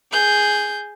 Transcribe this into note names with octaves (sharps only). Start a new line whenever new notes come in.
G#4 G6